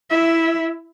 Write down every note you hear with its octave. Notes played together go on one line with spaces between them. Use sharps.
E4 E5